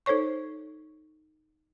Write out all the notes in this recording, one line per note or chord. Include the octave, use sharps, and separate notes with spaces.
D#4 A4 C5 C#5 C#6